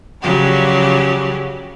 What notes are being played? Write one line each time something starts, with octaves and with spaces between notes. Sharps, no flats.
C#3 F3 F#3 G4 D5